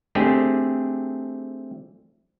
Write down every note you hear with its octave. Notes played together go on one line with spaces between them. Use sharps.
A3 C4 D4 G4 G#4